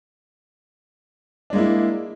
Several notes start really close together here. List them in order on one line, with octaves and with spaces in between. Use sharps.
D4 G#3 A#3 E4